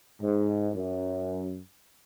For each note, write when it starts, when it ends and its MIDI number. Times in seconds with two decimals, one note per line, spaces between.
0.21 0.68 44
0.74 1.60 42